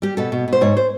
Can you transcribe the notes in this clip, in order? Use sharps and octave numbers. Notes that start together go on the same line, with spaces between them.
G3 G4
B2 A4
B2
B2 C5
G#2 C#5
C5